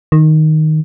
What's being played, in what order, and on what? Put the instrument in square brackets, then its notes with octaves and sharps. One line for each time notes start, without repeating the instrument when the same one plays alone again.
[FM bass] D#3